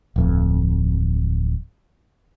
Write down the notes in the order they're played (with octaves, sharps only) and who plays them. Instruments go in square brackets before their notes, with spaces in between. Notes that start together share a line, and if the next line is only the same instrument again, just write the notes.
[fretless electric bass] D1 F2